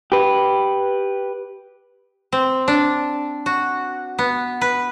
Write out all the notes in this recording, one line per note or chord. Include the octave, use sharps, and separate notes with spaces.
G4 B4
C4
D4
F#4
B3
B4